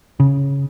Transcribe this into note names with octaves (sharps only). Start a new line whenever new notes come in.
C#3